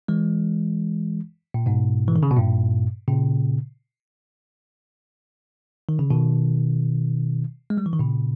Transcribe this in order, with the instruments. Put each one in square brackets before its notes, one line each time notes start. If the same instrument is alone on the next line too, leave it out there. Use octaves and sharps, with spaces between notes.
[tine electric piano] E3 G#3
A#2
G#2 B2
E3
D#3
C#3
B2
G2 A#2
A#2 C#3
D#3
C#3
B2 D#3
G#3
G3
E3
D#3
A#2 C#3